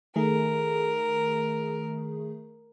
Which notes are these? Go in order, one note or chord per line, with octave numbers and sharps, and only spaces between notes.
D#3 A3 G#4 A#4